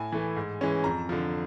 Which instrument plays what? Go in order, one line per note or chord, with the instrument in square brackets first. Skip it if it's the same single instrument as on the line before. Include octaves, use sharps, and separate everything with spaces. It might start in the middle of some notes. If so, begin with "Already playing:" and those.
Already playing: [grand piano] A2 G#5
E3 A3
G#2
E3 G#3 C#4
F2 A#5
D3 F3